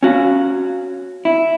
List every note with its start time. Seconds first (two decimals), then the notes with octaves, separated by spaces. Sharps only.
0.03 C#4 F#4 F5
1.25 E4